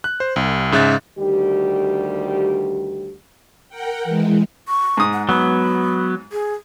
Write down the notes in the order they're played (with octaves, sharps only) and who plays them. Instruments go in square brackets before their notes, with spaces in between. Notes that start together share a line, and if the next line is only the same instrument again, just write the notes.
[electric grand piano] F#6
C5
C2
G#2 C#3 E5 F#6 A6
[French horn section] D2 D#3 G3 G4
[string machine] A#4 F#5 G5
E3 G#3
[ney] C#6
[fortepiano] G#2 D#6
[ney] F#5
[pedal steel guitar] F#3 B3 [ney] B5
[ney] G#4